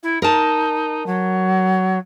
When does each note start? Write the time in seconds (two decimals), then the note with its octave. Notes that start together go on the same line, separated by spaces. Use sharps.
0.03 E4
0.22 D#4 A#4 A5
1.06 F#3